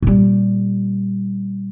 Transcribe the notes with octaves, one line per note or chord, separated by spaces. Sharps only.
A#2 G3